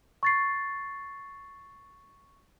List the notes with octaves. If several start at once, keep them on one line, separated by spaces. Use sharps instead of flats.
C#6 A6 C7